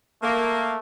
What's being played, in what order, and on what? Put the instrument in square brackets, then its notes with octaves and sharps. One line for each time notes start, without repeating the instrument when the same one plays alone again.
[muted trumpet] A3 [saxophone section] A#3